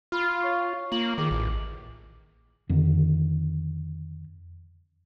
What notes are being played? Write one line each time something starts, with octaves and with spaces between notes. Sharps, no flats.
F4 B5 F6
C#5 C#6 C7
A#3 F4 F#7
D#3 G#4 D6
A1
F2 D3 D#3